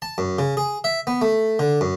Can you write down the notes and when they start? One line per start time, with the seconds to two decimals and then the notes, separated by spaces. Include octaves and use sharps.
0.02 A5
0.18 F#2
0.39 C#3
0.57 G#4
0.84 E5
1.07 B3
1.22 A3
1.59 D3
1.81 F#2